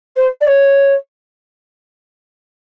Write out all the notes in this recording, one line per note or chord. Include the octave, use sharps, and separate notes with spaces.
C5
D5
C#5